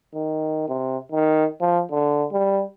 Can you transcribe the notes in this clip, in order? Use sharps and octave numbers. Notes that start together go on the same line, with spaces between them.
D#3
C3
D#3
F3
D3
G3